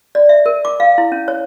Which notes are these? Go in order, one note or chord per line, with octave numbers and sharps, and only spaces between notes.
D5
E5
A#4
D6
F5
E4
C#4
C#5